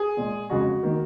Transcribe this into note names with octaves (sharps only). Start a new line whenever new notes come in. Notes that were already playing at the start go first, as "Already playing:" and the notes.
Already playing: G#4
A#2 G#3
F2 C#3 G#3 F#4
D#3 A#3